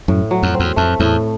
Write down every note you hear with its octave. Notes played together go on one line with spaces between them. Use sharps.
F#2 A2
F#3
F2
C4
E2
F2 A3
E2 A2